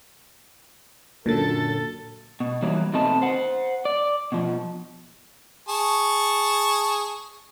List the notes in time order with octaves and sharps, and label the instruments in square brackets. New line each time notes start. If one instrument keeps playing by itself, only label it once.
[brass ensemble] F#2 A4 [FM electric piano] A#2 D3 A6
[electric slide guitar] B2
E3 F#3 G3 A#3 D#4
B2 D#3 A3 C4 D#5 A5
C5 F#5
D5
B2 F3
[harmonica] G#4 A5 C#6